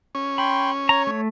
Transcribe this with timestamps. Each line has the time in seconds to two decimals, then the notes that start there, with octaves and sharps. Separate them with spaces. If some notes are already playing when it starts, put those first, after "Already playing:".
0.15 C#4
0.38 G5 B5 C6
0.89 C#5 A#5
1.07 A3